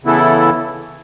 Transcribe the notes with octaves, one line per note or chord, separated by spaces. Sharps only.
C#3 E3 B3 E4 A4